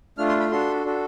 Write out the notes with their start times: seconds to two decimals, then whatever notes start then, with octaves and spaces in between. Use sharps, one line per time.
0.18 A3 D4 F4 F6
0.29 C6
0.40 B5
0.51 D4 F#4 A4 C6
0.85 D4 F#4 A4